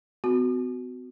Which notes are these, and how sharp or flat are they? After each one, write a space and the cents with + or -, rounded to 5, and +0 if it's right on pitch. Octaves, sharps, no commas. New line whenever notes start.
B3 +45 F#4 +0